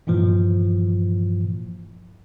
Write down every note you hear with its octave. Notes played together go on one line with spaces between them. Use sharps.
G2 A#2 E3 F3